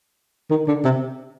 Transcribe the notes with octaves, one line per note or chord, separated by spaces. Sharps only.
D#3
D3
C3